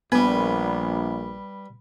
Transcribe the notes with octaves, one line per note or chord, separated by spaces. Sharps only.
A#1 G3 B3 B4